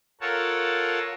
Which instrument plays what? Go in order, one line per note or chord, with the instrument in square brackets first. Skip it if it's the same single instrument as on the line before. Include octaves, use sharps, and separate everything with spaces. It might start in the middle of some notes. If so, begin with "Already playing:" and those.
[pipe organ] F4 A4 A#4 C#5 F#5 A5